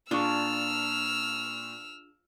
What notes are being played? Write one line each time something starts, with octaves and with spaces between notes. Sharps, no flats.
A#2 D4 F4 G#4 C#6 E6 F6